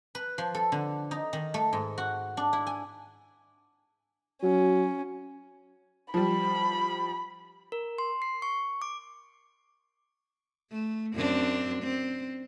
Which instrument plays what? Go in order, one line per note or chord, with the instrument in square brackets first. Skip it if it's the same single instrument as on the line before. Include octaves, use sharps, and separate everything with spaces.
[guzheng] B4
F3
A4
D3
D#4
D#3
A3
G#2
F#4
D4
E4
G#5
[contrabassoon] F#3 [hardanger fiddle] C#4
[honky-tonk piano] F3 G3 [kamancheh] B5
[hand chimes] A#4
C6
C7
C#6
D6
[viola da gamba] A3
F#2 C4 D4
C4